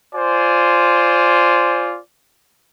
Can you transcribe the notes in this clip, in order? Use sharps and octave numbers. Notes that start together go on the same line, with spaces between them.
F4 C5 D5 G#5